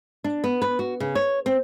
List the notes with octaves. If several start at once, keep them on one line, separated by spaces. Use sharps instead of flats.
D4
B3
B4
F#4
C#3
C#5
C4